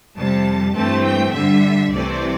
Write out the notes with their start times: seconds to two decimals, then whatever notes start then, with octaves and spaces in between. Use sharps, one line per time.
0.17 F2 C3 G3 A5
0.75 G2 E3 A3 C4 A5
1.05 G5
1.35 G2 D3 G3 E5
1.92 C2 C3 E3 A3 C4 D5